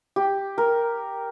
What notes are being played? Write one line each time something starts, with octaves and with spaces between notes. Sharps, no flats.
G4
A#4